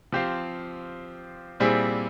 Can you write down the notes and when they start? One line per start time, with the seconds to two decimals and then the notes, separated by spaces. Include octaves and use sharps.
0.12 F3 C4 G4 C5 F5
1.60 A#2 G3 C4 E4 G#4